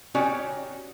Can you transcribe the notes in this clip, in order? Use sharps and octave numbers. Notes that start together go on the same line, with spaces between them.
C#4 D#4 F#4 G4 C#5 D5